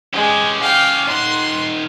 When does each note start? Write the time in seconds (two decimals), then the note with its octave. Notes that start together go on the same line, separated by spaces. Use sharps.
0.13 G#3 C#4 G4
0.62 F5 G5
1.08 D#3 F#5 C6